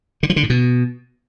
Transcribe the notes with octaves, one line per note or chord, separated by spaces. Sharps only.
D3
F3
D3
A2
B2